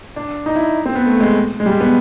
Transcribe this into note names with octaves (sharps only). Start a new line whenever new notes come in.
D4
D#4
E4
C4
B3
A3
G#3
G#3
G3
B3